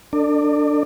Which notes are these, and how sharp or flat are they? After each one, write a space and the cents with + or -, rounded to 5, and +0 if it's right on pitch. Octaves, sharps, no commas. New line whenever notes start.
D4 +0 A4 +35 D5 +30